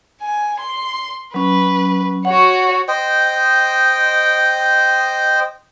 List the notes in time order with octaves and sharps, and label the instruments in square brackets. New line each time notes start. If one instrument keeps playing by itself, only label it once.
[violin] G#5
C6
[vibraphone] F#3 C#4 [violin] B4
[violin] F#4 C#5 [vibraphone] F#5
[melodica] C5 D#5 G5